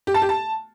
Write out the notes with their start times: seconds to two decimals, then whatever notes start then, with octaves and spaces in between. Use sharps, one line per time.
0.07 G4
0.14 A5
0.22 G4
0.29 A5